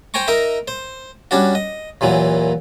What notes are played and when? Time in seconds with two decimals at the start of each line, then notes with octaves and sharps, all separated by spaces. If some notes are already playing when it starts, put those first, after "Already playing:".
0.14 C5 G5 G#5 A#5 C#6
0.28 D#4 A#4 D#5 E5
0.68 C5
1.31 G3 C#4 D4 F#4
1.55 D#5
2.01 D#2 A#2 E3 F#3